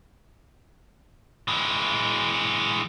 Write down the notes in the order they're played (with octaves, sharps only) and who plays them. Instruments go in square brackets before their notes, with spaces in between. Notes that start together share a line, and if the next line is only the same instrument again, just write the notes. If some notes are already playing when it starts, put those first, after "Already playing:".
[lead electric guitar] E3 G#3